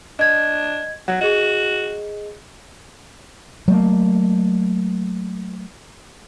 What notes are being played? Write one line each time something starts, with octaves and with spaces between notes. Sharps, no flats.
D4 D#5 G#6
F#3 F#5
F#4 G#4 D#5
F#3 A3 A#3